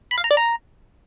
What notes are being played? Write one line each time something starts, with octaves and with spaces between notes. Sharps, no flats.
B5
F5
A#5
D5
A#5